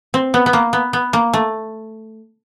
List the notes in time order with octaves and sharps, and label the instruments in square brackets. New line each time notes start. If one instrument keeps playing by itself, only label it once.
[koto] C4
B3
B3
A#3
B3
B3
A#3
A3